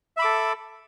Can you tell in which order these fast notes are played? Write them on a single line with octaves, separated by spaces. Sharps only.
E5 B5 D6 A4